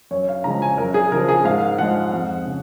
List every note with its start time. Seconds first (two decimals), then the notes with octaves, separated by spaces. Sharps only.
0.11 F#2 C#5
0.29 F5
0.44 C#3 F3 G#3 A#5
0.62 G#5
0.78 F#2 A#4
0.94 G#4
1.11 C#3 F3 A#4
1.28 G#4
1.45 G#2 F5
1.78 F3 G#3 F#5
2.12 F2
2.45 C#3